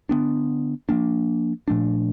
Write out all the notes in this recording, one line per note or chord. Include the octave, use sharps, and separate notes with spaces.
D3 F#3 B3 D4
F3 A#3 D4
A#2 F3 A3 D4